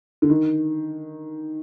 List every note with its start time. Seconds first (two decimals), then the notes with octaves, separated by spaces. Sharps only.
0.22 D3
0.30 D#3